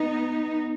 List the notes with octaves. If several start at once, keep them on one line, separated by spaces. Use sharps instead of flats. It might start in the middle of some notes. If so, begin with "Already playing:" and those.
Already playing: B3 D#4